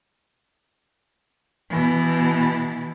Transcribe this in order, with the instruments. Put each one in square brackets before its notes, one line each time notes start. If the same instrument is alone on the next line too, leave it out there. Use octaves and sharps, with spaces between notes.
[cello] B2 E3